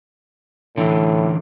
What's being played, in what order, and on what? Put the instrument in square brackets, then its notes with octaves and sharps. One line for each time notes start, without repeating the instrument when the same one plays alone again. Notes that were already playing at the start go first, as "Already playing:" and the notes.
[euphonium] A2 [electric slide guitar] D3 E3